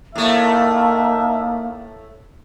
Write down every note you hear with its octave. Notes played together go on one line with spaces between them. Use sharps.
A2 A3 A#3 D#4 E5